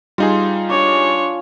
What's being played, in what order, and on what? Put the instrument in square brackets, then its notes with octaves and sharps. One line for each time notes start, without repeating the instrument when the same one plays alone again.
[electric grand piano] G3 D#4 G#4 [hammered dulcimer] F4
[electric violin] D4 C#5 [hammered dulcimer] F5 G#5 D6